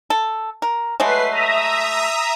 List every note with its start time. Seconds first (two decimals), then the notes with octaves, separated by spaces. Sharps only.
0.10 A4
0.62 A#4
1.00 F#3 G#3 A3 B4 C7
1.31 E5 A#5 D#6